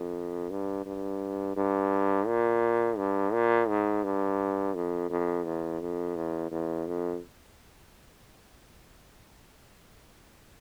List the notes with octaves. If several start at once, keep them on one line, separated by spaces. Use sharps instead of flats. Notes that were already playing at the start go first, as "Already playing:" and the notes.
Already playing: F2
G2
G2
G2
A#2
G2
A#2
G#2
G2
F2
F2
E2
F2
E2
E2
F2